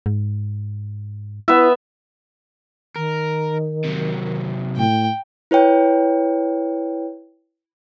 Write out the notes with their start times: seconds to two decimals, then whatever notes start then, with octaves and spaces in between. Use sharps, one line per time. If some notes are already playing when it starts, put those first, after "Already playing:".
0.06 G#2
1.48 B3 E4 E5
2.96 D#3 A#4
3.85 C3 F#3
4.77 A2 G5
5.51 E4 B4 C#5 G5